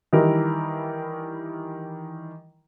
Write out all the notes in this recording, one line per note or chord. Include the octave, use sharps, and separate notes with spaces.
D#3 E3 G3 E4 A#4